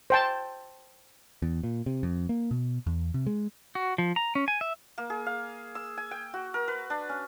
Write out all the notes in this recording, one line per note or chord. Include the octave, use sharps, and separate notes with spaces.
C5 G5 A5
E2
A#2
C3
F2
A#3
B2
E2
C3
G#3
F#4
F3
A#5
C#4
G#5
E5
A#3
G#4
F5
E6
G#5
G5
F#4
A#4
B4
D4
C#4